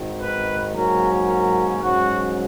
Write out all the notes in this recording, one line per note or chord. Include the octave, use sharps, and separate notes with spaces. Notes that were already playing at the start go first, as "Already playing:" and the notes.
Already playing: G#1 G#2 D#3
B4
G#2 F#3 A#3 C#4 A#4
A#4
G#2 F#3 C#4 F#4